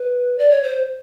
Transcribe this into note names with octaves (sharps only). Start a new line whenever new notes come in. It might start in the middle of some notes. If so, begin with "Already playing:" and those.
Already playing: B4
D5
C#5
C5